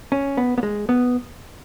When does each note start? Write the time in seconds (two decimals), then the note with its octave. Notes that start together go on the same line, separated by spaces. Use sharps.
0.12 C#4
0.37 B3
0.58 B3
0.63 G#3
0.89 B3